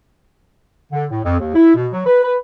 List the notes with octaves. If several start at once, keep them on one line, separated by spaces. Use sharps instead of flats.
D3
A2
F2
D#2
E4
B2
F#3
B4
B4